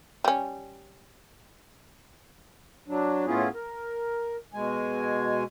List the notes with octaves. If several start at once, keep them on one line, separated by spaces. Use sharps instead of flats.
G3 C#4
F#3 D4
A2 B3 C#4 E4 F4 G#4
A#4
B2 G#3 G#5